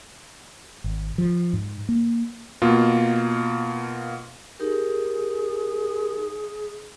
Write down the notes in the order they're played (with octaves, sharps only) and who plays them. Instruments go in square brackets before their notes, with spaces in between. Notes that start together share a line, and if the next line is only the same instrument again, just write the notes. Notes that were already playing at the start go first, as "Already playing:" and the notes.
[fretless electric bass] G#1
F3
G#2
A#3
[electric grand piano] B2 A#3 F4
[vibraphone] D#4 G4 A#4 [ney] G#4